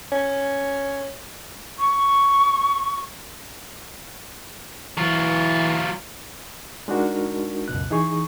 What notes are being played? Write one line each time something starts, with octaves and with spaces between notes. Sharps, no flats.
C#4
C#6
E3 F#3 F4
G#3 D4 D#4 F#4 A#4
C#2 F#2 B2 F#6
E3 D#4 G#4 C#6